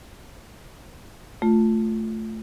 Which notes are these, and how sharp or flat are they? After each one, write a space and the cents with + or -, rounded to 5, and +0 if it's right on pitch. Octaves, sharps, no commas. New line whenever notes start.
A3 +0 F4 +0